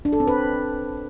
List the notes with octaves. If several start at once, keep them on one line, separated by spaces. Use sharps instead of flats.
D4
A4
C4
B4